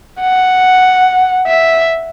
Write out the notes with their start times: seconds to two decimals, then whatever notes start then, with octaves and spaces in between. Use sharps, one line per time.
0.20 F#5
1.47 E5